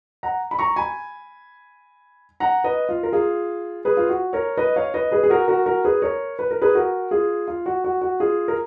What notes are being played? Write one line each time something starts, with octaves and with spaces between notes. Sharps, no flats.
F#5 A#5
B5
A#5 C#6
G#5 B5
F#5 A#5
B4 D#5
F4
A#4
F4 G#4
G#4 B4
F4
F#4
A#4 C#5
B4 D#5
C#5 F5
B4 D#5
G#4 B4
G#4
F#4 A#4
F#4 A#4
F#4 A#4
G#4 B4
A#4 C#5
B4
A#4
G#4 B4
F#4 A#4
F4 G#4
F4
F#4
F#4
F#4
F4 G#4
A#4